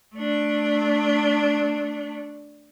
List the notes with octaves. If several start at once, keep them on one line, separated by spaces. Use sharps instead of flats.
A3 D4